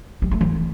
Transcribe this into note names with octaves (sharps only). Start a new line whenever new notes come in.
G3
A3
E3